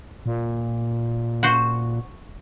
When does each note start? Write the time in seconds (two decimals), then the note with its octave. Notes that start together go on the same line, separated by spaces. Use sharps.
0.26 A#2
1.43 F#4 C5 F#5